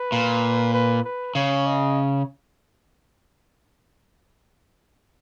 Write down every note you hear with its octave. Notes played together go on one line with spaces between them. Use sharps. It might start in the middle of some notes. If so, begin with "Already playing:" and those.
Already playing: B4
A#2
B4
B4
C#3 C#5
D#5